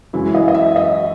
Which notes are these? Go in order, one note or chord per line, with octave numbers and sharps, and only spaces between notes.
F#2 E3 G#3 E4
D#5
D#5
E5
D#5